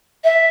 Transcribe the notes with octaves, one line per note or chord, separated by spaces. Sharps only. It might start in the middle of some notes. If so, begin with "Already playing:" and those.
E5